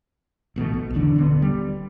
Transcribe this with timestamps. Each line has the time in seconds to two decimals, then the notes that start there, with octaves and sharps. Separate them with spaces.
0.56 A1 B2 E3 A3
0.74 B1
0.94 D#1 E2 D3 D4
1.16 D#1 D3 B3
1.42 G3